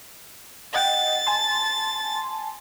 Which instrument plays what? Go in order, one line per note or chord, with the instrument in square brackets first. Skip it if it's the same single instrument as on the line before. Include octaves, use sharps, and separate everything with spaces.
[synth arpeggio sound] D#5 F#5 G5 [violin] A6
[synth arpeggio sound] G#5 A5 C6